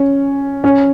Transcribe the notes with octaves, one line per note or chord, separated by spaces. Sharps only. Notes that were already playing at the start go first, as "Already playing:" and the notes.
Already playing: C#4
C#4